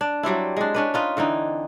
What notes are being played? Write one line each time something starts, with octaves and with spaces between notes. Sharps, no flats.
D4
F#3 G3 C4 E4
G#3 D4
C#4 D4 B4
D#4 F4 B4
D3 E3 C4 D#4